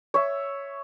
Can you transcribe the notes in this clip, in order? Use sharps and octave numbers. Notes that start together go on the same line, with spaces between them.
C#5 E5